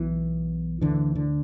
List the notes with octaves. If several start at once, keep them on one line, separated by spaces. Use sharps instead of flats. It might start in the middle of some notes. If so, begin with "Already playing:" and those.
Already playing: B1 B2 E3
D2 D3 E3
D3